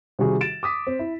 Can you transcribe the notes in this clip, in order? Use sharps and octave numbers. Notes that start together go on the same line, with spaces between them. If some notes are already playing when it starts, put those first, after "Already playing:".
C3 D#3 G3 F#4 G#4
A6 D7 E7
D6 D#6 B6
C4
E4